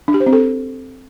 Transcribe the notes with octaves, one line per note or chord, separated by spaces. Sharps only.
D4
G4
C5
C4
A4